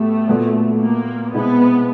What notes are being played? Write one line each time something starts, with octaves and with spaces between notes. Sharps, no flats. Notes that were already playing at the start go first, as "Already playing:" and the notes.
Already playing: A2 F#3 A3 B3 G4
A#2 F#3 B3
A#3
B2 G#3 B3 C4 E4